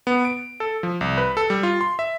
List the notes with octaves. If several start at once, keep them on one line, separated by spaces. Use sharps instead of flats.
B3
D7
A4
F3
C2
B4
A4
G3
F4
C6
E5